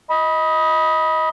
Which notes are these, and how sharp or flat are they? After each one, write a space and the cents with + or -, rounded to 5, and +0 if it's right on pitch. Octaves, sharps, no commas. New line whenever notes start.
D#5 +20 B5 -15